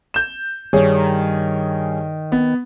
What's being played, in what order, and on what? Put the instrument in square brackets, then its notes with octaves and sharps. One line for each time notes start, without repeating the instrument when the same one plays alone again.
[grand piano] G6 E7
[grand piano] G2 G#4 C#5 [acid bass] D#3
[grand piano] B3